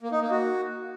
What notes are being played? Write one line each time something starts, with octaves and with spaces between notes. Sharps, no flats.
A#3
D#4
A#3
F#4